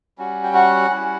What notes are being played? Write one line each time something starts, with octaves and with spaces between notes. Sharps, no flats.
G3 C#4 F#4
G5
F#4 F#5
G3 C#4 E4